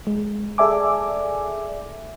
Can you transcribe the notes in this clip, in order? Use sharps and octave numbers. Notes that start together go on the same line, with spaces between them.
G#3
G#4 A4 D5 E5 G#5 D6